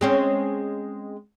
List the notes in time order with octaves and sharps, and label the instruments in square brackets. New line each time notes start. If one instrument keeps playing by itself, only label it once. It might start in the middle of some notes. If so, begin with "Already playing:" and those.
[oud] G#3 C4 C#4